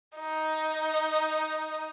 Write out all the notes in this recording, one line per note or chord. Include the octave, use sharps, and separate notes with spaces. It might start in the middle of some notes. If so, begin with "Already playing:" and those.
D#4